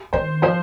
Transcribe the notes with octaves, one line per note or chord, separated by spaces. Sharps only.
D#3 C5
F3 C5